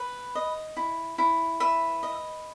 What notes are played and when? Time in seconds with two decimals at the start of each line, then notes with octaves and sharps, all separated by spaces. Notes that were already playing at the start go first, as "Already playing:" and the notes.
Already playing: B4
0.35 D#5
0.77 E4
1.18 E4
1.60 B4 E5
2.03 D#5